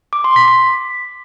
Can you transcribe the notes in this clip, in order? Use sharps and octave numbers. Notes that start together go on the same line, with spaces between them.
D6
C6
B6
B6